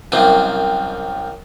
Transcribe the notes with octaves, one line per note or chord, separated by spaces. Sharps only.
C2 F#2 A#3 C4